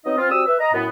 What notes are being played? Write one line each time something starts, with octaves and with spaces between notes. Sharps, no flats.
F#3 B3 C4 D#4 D#5
C4 F4
G3 C4 F#4 D#6 E6
B4 E5
D#5 A#5
F#2 A2 B3